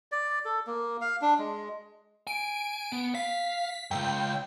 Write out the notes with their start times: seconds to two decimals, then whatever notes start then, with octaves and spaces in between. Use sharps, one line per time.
0.12 D5
0.45 A4
0.67 A#3
1.01 F5
1.21 D4
1.39 G#3
2.27 G#5 D7
2.92 B3
3.15 F5 B6
3.91 C#2 F#2 G5